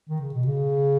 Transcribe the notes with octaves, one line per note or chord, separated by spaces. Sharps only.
D#3
C#3
B2
C#3